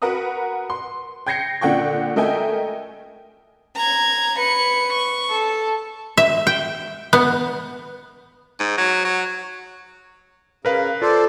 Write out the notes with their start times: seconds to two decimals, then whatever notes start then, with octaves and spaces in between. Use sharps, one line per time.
0.02 F#4 A#4 B4 F#5 A#5 D#6
0.70 C6
1.26 G5 G6 G#6 A#6 C7 C#7
1.61 A#2 D3 F#5 G5 C#6
2.16 A3 A#4 D#5 E5 G5 G#5
3.76 A#5 G#6
4.39 B4 C#7
4.93 C#6
5.31 A4
6.17 E5
6.47 G5
7.13 B3
8.60 G#2
8.78 F#3
9.05 F#3
10.65 C#3 A#4 B4 F5
11.02 F4 A4 C5 D5